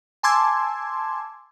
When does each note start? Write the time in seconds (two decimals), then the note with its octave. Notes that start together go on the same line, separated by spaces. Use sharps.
0.23 G#5 A5 C6 D6 E6 G#6